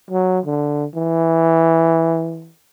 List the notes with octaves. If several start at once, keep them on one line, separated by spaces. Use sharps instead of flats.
F#3
D3
E3